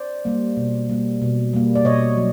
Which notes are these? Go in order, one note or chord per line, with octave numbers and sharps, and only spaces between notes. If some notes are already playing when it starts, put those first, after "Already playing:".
Already playing: C5 D5
G3 A#3
B2
G3 A#3
B2
G3 A#3
D5
B2 C#5 D#5
F#3